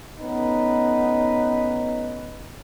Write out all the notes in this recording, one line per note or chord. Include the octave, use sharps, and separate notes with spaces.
A3 B3 C#4 D#4 B4